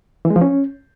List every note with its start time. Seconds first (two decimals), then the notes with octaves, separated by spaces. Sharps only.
0.25 E3
0.30 G#3
0.36 F3
0.41 C#4